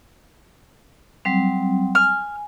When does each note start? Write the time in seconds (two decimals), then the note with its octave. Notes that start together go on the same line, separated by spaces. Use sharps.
1.25 F#3 G3 C4
1.95 G#5 F6